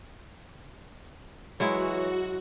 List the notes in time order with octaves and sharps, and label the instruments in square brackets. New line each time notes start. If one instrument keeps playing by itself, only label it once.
[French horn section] E3 C#5 [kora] F#3 G#3 E4 [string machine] F#4